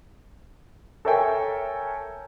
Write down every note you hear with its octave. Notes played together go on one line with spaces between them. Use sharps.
A4 A#4 C#5 E5 G5 G#5